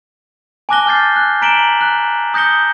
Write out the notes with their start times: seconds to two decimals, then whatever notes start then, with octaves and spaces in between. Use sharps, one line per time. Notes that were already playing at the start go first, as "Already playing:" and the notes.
0.69 G#5 A5 D6 F#6 A#6 G7
0.86 G#5 F6 G6 A6 C7
1.16 F#6
1.42 A#5 B6 D7 E7 F#7 G7
1.81 F#6
2.34 D#6 G6 A#6 C#7 G7